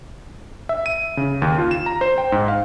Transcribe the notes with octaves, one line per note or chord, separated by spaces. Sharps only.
E5
D#7
C#3
D#2
F4
E7
A#5
C5
G5
G#2
F5